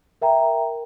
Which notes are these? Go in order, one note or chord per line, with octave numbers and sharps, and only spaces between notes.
A#4 E5 G5 A#5